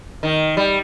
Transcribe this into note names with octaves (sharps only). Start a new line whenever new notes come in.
D#3
G3